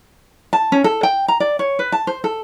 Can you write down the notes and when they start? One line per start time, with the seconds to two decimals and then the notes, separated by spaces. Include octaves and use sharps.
0.53 A5
0.72 C#4
0.84 A4
1.03 G5
1.28 A#5
1.40 D5
1.59 C#5
1.79 B4
1.92 A5
2.07 C5
2.24 A4